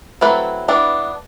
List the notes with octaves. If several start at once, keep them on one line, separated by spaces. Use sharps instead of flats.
F#3 A3 C4 E4 B4
E3 B3 D4